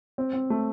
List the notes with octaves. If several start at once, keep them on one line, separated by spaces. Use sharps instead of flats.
C4
C4
A3